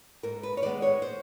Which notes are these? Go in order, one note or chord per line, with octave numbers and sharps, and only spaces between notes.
G#2 A#4
B4
C#5
D#3 G#3 B3 D5
C#5
C5